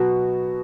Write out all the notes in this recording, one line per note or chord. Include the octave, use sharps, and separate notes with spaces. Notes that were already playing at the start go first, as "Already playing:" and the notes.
Already playing: B2 F#3 B3 F#4